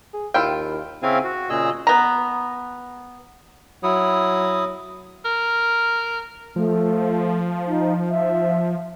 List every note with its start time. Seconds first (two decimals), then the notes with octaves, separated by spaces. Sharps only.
0.14 G#4
0.34 D#2 E4 F4 G5
1.03 C#3 C4 C#4 E4 F5 G#5
1.24 F#4
1.50 A#2 C#3 G#4 D#5 E6
1.87 B3 A#5
3.83 F#3 E4 D#6
5.25 A#4
6.56 F3 A3
7.67 D#4
8.10 E5